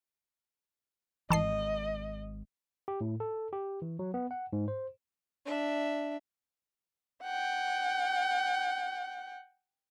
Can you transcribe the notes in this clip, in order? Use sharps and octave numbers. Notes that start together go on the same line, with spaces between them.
G#1 E3 G#3 D#5 A5 C7
G4
A2
A4
G4
E3
F#3
B3
F#5
G#2
C5
D4 E5
F#5 G5